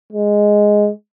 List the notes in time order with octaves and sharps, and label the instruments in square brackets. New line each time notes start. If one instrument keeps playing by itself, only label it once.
[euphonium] G#3